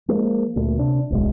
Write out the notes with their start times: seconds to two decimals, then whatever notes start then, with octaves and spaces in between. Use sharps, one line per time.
0.08 F3 G#3 A#3
0.56 D2 A#2 A3
0.78 C3 D4
1.10 D1 B1 F#2 G#3